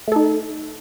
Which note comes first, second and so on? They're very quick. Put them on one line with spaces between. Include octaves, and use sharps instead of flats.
A3 A4 D#4